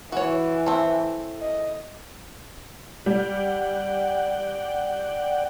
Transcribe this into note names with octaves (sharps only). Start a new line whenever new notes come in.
E3 F#4 C#5
A3 C4
D#5
G3 D5 F#5 G5